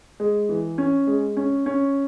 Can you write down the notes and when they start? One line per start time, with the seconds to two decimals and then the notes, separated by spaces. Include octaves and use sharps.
0.20 G#3
0.49 E3
0.78 C#4
1.07 G#3
1.37 C#4
1.66 C#4